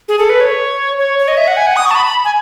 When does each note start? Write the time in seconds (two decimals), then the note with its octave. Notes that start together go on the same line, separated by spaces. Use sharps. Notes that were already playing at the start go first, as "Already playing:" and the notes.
0.09 G#4
0.19 A4
0.30 B4
0.40 C#5
0.99 C#5
1.19 C#5
1.28 D#5
1.37 E5
1.47 F#5
1.57 G#5
1.67 F#5
1.76 D#6
1.86 C#6
1.91 A5
1.95 B5
2.05 B5
2.25 G#5